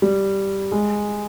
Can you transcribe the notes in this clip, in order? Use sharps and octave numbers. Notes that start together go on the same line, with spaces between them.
G3
G#3